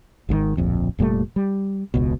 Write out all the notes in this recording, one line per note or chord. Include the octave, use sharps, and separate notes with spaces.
G#1 G#2 C3 D#3
D1 A#1 F2
F1 A#2 G3 A3
G3
E1 C#2 B2